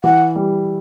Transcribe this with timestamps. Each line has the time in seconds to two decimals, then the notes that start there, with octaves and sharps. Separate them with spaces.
0.04 E3 F#5
0.35 G3